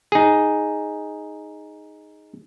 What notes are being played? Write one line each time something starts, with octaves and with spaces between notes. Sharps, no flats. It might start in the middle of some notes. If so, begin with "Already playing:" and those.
D#4 G#4